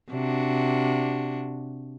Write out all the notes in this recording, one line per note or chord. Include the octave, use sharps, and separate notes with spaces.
C3 D4 F#4